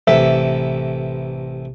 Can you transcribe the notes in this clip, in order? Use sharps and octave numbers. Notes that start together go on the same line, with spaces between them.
A1 C3 A4 E5